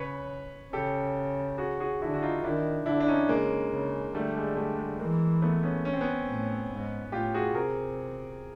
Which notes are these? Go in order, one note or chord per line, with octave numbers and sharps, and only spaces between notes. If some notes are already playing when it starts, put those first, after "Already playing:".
Already playing: C#3 B4 C#5
C#3 G4 A4
F#4 G#4
F#4 G#4
D3 E4 F#4
F#4
D#4 F4
D#3 D4 E4
D3 D4 E4
D4
C#4 D#4
C#3 G#3 A#3
C#3
D3 G3 A3
G#3
G3 A3
G#3
E3 G#3 A#3
A3 B3
B3 C#4
C#4
C4
B3 C#4
A2
G#2
A2 F4 G4
F#4 G#4
C3 G#4 A#4